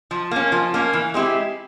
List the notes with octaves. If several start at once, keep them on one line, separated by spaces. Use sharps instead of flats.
F3
A#3 C#4
F3
A#3 C#4
E3
G#3 C4 E4 G4